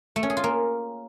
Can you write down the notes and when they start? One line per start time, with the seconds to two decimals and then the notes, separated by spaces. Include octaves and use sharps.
0.16 A3
0.23 C#4
0.30 G#4
0.37 F4
0.44 A#3